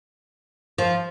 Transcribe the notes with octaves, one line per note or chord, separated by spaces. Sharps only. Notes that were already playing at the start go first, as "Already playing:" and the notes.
F3